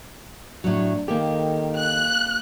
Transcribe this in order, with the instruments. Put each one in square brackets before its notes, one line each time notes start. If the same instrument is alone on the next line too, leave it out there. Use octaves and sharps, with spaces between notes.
[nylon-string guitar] A2 F#3 [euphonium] D4
[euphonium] D#3 [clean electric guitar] A#3 G4 [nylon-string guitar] A4
[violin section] F#6